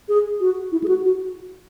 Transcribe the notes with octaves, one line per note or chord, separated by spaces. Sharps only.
G#4
F#4
E4
G#4
F#4
F#4